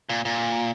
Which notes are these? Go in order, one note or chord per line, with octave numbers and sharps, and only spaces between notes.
A#2
A#2